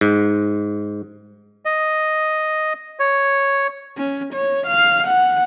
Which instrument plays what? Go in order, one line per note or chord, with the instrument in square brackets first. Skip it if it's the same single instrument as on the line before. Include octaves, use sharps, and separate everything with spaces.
[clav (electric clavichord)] G#2
[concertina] D#5
C#5
[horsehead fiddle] C#4
C#5
F5
F#5